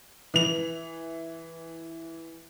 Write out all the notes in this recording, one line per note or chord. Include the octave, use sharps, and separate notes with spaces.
E3 F7